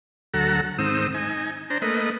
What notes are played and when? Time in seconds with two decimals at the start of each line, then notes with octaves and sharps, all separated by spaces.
0.34 D2 F#3 A4 F#5 A#5
0.78 G#2 D#3 C4 D#6 E6
1.14 D#4 G#5
1.70 D4 C5 A#5
1.82 A3 A#3 B4 D#5